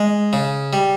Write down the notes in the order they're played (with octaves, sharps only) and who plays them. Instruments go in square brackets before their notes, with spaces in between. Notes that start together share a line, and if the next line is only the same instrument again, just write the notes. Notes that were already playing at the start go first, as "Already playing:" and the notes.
Already playing: [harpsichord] G#3
C#3
G3